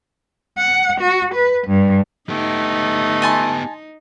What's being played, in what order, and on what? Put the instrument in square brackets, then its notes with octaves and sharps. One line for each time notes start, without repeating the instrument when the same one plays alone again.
[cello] F#5
F#4
B4
G2
[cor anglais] A3 [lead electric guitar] B3 G4 [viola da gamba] D#4
[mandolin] G#5 A5 C6